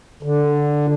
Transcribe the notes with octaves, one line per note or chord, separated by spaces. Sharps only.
D3